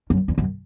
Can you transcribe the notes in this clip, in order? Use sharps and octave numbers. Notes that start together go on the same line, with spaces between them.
F#2
E2
F#2